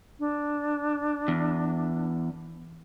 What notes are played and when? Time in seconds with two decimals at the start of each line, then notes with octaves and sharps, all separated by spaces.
0.19 D4
1.28 E2